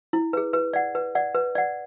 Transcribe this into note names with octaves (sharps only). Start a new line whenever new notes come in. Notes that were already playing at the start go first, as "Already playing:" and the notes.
E4
G#4 B4
B4
D5 F#5
B4
D5 F#5
B4
D5 F#5